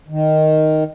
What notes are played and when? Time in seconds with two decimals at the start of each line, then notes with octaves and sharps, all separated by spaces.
0.08 D#3